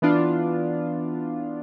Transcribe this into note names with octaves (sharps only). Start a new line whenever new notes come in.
E3 B3 D4 F4